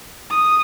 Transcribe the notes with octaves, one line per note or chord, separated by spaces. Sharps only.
D#6